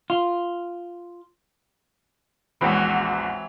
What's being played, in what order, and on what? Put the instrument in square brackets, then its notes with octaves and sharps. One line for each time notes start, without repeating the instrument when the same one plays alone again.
[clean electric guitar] F4
[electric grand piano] A#1 E2 [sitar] E3 F#3 C4 [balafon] G#3 B5 [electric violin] F#4